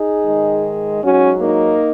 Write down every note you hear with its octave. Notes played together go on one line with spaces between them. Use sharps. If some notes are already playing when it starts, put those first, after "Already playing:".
Already playing: D#4 G#4
G#2 D#3 G#3
G#2 F#3 C#4 F#4
A#3 D#4